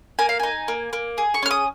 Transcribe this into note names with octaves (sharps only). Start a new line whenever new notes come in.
A#3 G#5
F5
D#4 G#5
A#3
A#3
G#4
C#6
C#4 F6
D#6